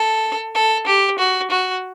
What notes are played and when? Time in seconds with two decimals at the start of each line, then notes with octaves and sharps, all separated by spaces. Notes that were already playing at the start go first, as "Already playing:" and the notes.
Already playing: A4
0.55 A4
0.86 G4
1.18 F#4
1.50 F#4